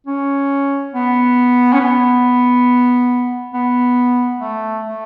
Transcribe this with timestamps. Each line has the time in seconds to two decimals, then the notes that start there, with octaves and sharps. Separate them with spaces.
0.06 C#4
0.93 B3
1.73 C#4
1.80 B3
3.53 B3
4.39 A3
4.83 A3